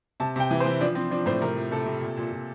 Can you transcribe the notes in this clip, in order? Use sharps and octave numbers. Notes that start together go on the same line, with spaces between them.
C3 A5
C3 G5
E3
C5
E3
F3 D4
F3 C4
F3 D4
A2 C5
C3 A#4
F3
C3 A4
C3
A#2
A#2
A#2